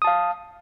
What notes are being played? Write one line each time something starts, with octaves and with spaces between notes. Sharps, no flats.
F5 A5 D#6